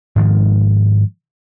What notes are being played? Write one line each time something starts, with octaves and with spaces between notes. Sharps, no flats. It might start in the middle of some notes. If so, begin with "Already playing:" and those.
G#2 D#3 F3 G#3